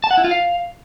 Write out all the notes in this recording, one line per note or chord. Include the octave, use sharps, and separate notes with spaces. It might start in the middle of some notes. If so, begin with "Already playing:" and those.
A5
F#5
E4
F4
F5